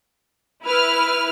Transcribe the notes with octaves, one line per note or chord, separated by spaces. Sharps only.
E4 B4 F6